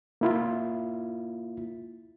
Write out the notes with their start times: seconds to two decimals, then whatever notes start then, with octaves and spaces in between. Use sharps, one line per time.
0.21 A#3 E4 F4